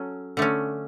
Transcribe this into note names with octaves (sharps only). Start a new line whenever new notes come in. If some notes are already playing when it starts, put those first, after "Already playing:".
Already playing: F#3 C#4 A4
D3 A3 C#4